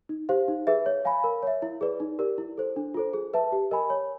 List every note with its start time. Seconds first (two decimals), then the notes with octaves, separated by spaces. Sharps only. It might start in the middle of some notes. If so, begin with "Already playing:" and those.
0.09 D#4
0.29 G4 C5 F5
0.48 D#4
0.67 G#4 B4 E5
0.86 C#5
1.05 F5 G#5 B5
1.24 A#4
1.43 C#5 E5
1.62 E4
1.81 G#4 B4 D5
2.00 D#4
2.19 G4 A#4 D5
2.38 E4
2.58 A4 C5
2.76 D4
2.94 F4 A4 C5
3.13 G#4
3.34 B4 E5 A5
3.52 G4
3.71 A#4 D#5 G#5 B5
3.90 C#5